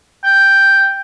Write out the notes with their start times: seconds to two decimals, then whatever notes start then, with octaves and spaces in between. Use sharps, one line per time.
0.24 G5